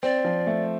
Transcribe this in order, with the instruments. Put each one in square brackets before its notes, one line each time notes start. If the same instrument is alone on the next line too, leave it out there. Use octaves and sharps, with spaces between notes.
[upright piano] C4 [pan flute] D5
[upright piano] F3
A3